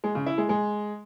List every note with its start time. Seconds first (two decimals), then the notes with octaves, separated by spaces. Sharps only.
0.04 G#3
0.15 C#3
0.26 E4
0.38 G#3
0.49 G#3